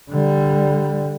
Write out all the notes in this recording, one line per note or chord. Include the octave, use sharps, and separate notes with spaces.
D3 G3